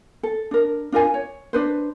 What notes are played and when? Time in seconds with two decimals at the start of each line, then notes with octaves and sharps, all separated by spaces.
0.23 A4
0.51 D4 A#4
0.92 D4 F4 A#4 G#5
1.14 C#5
1.53 D4 B4 C5